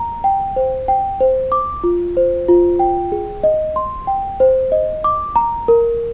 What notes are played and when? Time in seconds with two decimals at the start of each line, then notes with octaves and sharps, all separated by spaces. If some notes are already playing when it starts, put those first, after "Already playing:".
Already playing: A#5
0.24 G5
0.56 C5
0.88 G5
1.20 C5
1.52 D6
1.84 F4
2.17 C5
2.48 F4
2.79 G5
3.12 G#4
3.43 D#5
3.76 C6
4.07 G5
4.40 C5
4.72 D#5
5.04 D6
5.36 A#5
5.68 A#4